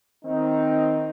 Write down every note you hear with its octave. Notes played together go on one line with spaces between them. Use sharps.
D#3 C4 D#4